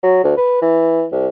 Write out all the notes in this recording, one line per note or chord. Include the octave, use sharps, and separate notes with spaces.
F#3
D2
B4
E3
C2